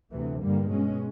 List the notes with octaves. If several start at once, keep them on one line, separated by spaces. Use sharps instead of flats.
D2 C3 E3 A3
G2 D3 G3 A#3
B2 G#3 C#4